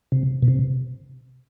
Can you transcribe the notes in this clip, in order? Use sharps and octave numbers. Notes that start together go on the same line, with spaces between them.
C3
B2
C3